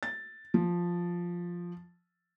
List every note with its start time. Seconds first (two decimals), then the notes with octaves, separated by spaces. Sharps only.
0.03 A6
0.54 F3